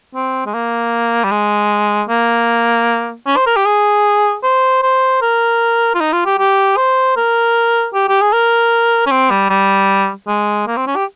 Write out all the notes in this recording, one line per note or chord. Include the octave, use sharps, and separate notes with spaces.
C4
G#3
A#3
G3
G#3
A#3
C#4
C5
A#4
G4
G#4
C5
C5
A#4
F4
D#4
F4
G4
G4
C5
A#4
G4
G4
G#4
A#4
C#4
C4
G3
G3
G#3
A#3
C4
C#4
G4